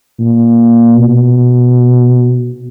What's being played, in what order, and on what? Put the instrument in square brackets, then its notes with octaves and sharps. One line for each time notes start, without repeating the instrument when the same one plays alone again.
[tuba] A#2
B2